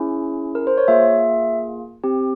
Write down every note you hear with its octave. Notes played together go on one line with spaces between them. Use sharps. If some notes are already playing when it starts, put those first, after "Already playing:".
Already playing: C#4 E4 G#4
A#4
C5
C#5
A#3 F4 G#4 E5
C4 G4